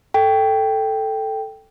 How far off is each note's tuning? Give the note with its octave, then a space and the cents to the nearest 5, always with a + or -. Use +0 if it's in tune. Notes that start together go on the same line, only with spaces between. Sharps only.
A4 +0 G5 +0